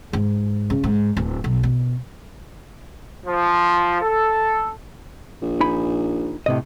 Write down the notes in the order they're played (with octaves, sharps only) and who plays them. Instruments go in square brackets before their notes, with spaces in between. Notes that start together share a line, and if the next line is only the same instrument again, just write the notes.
[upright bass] G#2
C#3
G#2
D1
B1
B2
[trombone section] F3
A4
[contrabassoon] A#1
[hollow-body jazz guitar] D#4 G#5 B5
A2 C3 D#5